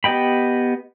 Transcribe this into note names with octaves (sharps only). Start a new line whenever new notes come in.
B3 G4 D#5 G5 B5